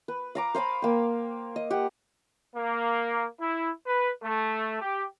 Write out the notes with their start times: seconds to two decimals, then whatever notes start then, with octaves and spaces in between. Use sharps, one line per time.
0.08 B4
0.35 F5 A#5 D6
0.55 C5 F5 G#5 B5
0.82 A#3 G5
1.56 D#5
1.70 G4 F#5
2.54 A#3
3.38 E4
3.86 B4
4.23 A3
4.80 G4